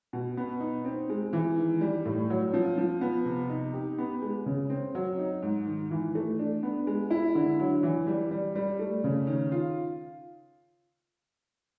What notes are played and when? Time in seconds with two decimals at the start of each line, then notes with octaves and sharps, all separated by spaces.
0.13 B2
0.37 B3
0.60 D#4
0.85 C4
1.10 G#3
1.33 E3
1.57 D#3
1.81 G3
2.05 A2
2.30 F#3
2.54 F3
2.78 F3
3.01 B3
3.25 C3
3.50 D#4
3.73 G4
3.98 B3
4.22 G#3
4.46 C#3
4.70 C4
4.95 F#3
5.18 D#4
5.42 G#2
5.66 D#3
5.91 E3
6.15 A3
6.39 D4
6.63 B3
6.87 G#3
7.10 E4
7.35 D3
7.60 F#3
7.83 E3
8.07 G3
8.31 G3
8.55 G3
8.79 A3
9.04 C#3
9.27 D#3
9.52 F4